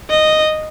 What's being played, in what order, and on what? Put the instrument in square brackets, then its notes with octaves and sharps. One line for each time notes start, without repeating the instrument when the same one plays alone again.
[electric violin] D#5